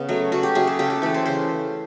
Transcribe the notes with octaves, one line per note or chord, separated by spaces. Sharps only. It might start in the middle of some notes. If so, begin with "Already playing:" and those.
Already playing: C#3 B3
F#3 A3
C#3 F#4
G4
F#3 A3 G#4
A4
C#3 G4
G4
E3 A3 A4
C5
C#3 C5